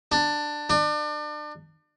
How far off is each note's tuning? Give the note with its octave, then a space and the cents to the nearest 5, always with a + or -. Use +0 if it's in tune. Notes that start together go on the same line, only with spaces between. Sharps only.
D4 +15
D4 +35